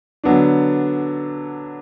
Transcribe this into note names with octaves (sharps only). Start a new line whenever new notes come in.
D3 F#3 B3 D4